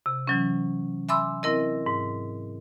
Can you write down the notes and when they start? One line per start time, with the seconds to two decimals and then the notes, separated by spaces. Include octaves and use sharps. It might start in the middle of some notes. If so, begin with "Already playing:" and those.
0.06 C3
0.27 E3 F#3 C#4
1.09 E5 G#5 B5 C6 D6 E6
1.43 C4 E4 A#4 D#5
1.86 G#2